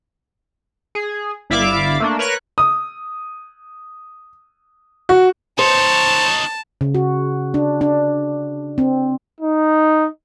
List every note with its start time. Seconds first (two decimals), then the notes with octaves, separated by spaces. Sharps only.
0.95 G#4
1.50 G1 E4 D5 E5 F5 D6
2.00 A3 A#3 D4
2.19 A#4 B4 C#5 C#6 F#6
2.58 D#6
5.09 F#4
5.59 D#4 C5 C#5 A5
6.81 C#3
6.95 F#4
7.54 D4
7.81 D4
8.78 C4
9.40 D#4